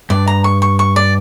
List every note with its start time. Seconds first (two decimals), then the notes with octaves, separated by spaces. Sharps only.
0.10 G2 D5
0.27 A#5
0.44 C#6
0.62 C#6
0.79 C#6
0.96 D5